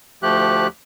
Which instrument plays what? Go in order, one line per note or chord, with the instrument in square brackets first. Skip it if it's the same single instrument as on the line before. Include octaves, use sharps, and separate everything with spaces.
[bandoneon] D2 F3 A3 G4 F#6